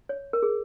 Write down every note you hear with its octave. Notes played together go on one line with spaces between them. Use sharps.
C#5
A#4
G#4